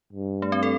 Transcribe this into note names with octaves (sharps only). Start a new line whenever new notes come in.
G2
A3
C4
A4